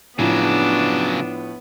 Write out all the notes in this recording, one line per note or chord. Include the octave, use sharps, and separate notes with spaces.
A2 C#3 F3 F#3 B3 D4